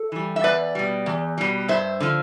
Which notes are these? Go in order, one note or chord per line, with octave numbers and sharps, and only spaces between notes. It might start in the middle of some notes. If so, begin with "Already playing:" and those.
Already playing: A4
E3 G3
E5
E2 B4 D5
B2 G3
E2
B2 G3
G2 C5 E5
D3 F3